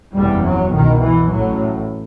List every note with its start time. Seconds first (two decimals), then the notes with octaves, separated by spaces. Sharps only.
0.13 F#1 E2 C3 G3
0.43 F#3
0.72 C2 B2 D#3
1.01 E3
1.30 A1 A2 F#3